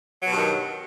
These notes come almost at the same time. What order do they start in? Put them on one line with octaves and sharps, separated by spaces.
F#3 B2 G2 D#3